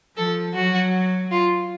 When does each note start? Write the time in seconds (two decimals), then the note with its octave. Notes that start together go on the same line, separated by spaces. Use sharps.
0.17 F3 A4
0.54 F#3 F#4
1.31 F4